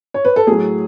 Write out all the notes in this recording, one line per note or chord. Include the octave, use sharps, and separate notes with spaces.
C#5
B4
A4
A2 F#3 G#4